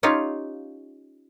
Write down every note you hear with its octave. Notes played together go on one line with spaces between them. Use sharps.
C#4 D#4 F4 G4 C#5 F5